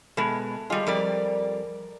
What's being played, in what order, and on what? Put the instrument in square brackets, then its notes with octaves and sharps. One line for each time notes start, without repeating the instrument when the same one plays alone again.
[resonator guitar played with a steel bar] B2 G#3 [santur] A3 B4
[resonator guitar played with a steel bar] G3 F4 [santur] G#3
[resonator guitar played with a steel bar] F2 G3 D5 [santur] A#4